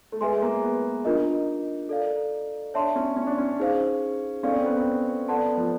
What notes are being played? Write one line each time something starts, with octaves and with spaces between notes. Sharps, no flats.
A3
G#3 G#4 B4 E5 G#5 C6
A#3
B3
D4 D#4 F4 A#4 D#5
A4 D5 F5
D4 C#5 E5 A5 C6
C#4
C#4
D4
C#4
D#4 G#4 C5 F5
C#4 A4 D5 F5
C4
B3
C4
B3 A4 D5 F#5 A5 C6
B3
F3